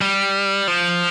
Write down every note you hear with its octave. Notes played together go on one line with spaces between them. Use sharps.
G3
F3